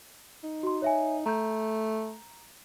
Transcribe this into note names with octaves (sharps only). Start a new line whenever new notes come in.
D#4
F#4 C6
C#5 E5 G#5
A3 A#5 G6